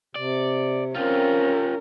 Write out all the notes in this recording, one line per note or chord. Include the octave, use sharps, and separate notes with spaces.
C3 D5
C4 C#4 F4 G4 A#4